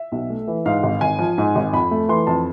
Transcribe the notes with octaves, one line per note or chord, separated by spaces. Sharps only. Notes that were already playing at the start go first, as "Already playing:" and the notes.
Already playing: E5
B1
A3
E3
G#2 F5
G#1
G#1 G#5
F3
G#2
G#1
F2 B5
A3
E3 C6
F2 A5